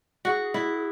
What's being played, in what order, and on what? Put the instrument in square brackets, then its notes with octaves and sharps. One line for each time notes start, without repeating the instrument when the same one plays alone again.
[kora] F#4 [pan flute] G#4
[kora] E4